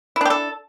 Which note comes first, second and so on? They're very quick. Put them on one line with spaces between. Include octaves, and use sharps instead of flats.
E4 D4 G4 A4